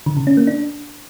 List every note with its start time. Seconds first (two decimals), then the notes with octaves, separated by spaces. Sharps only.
0.06 D3
0.17 C#3
0.27 C#4
0.37 A#3
0.47 D4